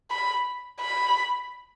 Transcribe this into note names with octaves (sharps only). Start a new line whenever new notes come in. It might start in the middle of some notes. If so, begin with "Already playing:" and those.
B5
B5